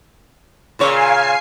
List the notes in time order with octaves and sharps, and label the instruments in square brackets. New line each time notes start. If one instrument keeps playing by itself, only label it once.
[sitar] A#2 C#3 C#5 [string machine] F5 G#5 C7